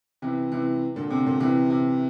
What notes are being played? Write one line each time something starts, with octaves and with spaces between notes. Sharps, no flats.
C3 E3
C3 E3
A#2 D3
C3
A#2 D3
C3 E3
C3